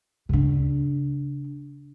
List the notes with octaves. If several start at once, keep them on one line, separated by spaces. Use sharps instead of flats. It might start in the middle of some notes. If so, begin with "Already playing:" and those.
C#3 D4